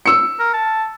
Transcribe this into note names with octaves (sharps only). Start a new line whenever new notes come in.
E6 C#7
A#4
A5